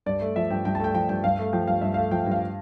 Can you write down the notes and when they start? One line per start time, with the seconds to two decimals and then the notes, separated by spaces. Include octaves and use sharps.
0.06 G2 D5
0.21 A3
0.36 F3 E5
0.50 G2 G5
0.65 G2 G5
0.75 A5
0.80 A3 G5
0.94 F3 G5
1.09 G2 G5
1.24 G2 F5
1.39 A3
1.53 F3 G5
1.67 G2 F5
1.81 G2 E5
1.94 F5
1.97 A3
2.11 F3 G5
2.26 G2
2.31 F5